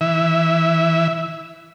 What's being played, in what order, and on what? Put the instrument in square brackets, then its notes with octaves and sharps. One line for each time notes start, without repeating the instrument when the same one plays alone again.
[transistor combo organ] E3 E5